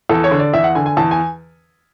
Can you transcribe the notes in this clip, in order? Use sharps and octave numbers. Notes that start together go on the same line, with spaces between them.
E2 A4
C#5
D3
D5
E2 E5
F#5
D3 G#5
G#5
E2 A5
G#5